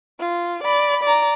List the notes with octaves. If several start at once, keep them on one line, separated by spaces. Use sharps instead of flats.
F4
D5 B5
D5 A#5